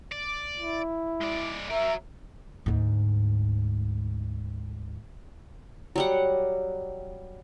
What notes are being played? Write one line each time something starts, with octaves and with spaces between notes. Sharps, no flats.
D5
E4
G#3 D5
F#3 A#4 E5
D2 G#2
F#3 G3 F#5